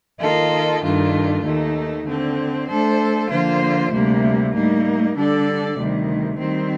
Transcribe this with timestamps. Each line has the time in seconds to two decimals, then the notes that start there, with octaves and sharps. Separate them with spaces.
0.21 D#3 A#3 F4 A4 D#5
0.83 G2 D#3 A3 D4 F4
1.45 D#2 D#3 A3 D#4
2.07 D3 A3 C4
2.68 A3 D4 A4 C5
3.30 D3 F3 A#3 F4 C5
3.93 D2 C3 G3 A#3
4.54 A2 G3 A#3 D#4
5.17 D3 G3 D4 A4 D5
5.77 D2 C3 D#3 G3
6.40 D#3 G3 C4